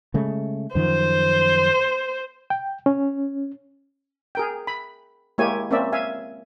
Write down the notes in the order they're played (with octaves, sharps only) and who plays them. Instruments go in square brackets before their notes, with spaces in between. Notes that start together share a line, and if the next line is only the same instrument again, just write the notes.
[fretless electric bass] C#3 G#3 A3
[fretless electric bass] F#2 D#3 F3 [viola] C5
[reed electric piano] G5
C#4
[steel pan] G#4 A#4 G5
B5
G#3 A#3 E4 G4 C#5 G#5
A#3 C4 C#4 D5 E5
E5 F5 G#5